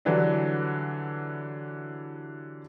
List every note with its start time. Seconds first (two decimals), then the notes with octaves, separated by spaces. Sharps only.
0.05 D3 E3 F#3 G3 D4